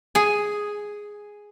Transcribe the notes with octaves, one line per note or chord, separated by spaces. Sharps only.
G#4 G#5